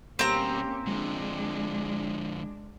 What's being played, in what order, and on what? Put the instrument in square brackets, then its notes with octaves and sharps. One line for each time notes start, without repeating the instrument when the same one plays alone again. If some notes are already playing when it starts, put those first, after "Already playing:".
[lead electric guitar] B2 G3 [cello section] A#3 C#4 G4 [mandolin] C4 A#5
[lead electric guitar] D3 F3 [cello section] G#3 D4